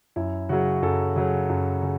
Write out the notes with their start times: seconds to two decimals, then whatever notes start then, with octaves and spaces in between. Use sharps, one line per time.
0.16 F#2 E4
0.49 C#3 F#3 F#4
0.82 F#2 A4
1.16 C#3 F#3
1.49 F#2
1.82 C#3